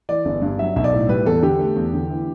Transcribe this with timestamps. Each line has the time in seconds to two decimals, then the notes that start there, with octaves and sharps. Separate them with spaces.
0.09 E3 D5
0.25 G1
0.42 G2
0.59 F#3 E5
0.76 B1 E5
0.84 D5
0.92 A2
1.09 G3 B4
1.26 E2 A4
1.42 D3 G4
1.59 A3
1.76 E2
1.94 D3
2.10 E3